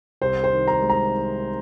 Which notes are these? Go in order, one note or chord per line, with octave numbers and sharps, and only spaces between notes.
C2 C5
C5
D#3
A#5
G#3
A#5